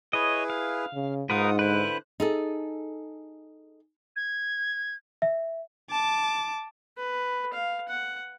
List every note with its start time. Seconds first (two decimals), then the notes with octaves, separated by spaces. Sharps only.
0.13 E4 G#4 B4 C#5 D#5
0.50 F5
0.94 C#3
1.30 G#2 D#4 F4 A#4 B4 F#5 D#6
1.59 D3 E4 B4 C5 F#6
2.20 D#4 G#4 A4
4.16 G#6
5.22 E5
5.90 A5 D6
6.97 B4
7.53 F5
7.89 F#5